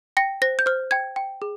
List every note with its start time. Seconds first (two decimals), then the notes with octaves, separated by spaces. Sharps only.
0.17 G5 A#6
0.42 C5 A#6
0.59 G6
0.66 C5 F6
0.91 G5 G#6
1.16 G5
1.42 G#4